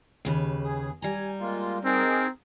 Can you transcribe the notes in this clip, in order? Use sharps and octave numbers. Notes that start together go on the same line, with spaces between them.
D#2 C#3 B4
G#4
G3 G#5 A#5
G#3 A#3 F4
C4 D#4 G#4 A#4